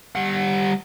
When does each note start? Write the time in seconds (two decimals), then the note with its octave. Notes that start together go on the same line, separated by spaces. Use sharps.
0.15 G3 F#5